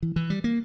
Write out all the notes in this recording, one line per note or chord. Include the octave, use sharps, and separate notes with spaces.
E3
E3
G3
A#3